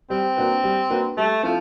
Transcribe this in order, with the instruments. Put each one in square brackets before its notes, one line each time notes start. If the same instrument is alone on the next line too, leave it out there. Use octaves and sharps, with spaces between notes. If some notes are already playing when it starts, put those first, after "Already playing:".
[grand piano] G3 [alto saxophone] C4
[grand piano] A#3 D4 F#4 B4
G3
A#3 D4 F#4 B4
[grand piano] G3 [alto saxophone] A3
[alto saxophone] F3 [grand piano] C4 E4 A4